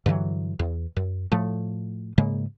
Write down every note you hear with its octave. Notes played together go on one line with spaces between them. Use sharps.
G2 D3 E3 F#3
E2
F#2
A2 F3 A3
G#2 C#3 G#3 A#3